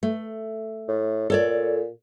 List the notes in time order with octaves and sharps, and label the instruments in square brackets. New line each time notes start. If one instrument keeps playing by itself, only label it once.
[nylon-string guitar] A3
[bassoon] A2
[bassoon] A#2 [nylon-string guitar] A4 C#5 D5